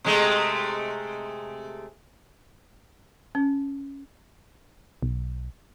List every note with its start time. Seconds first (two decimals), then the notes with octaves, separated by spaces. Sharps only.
0.04 C3 G#3 A3
3.35 C#4
5.03 B1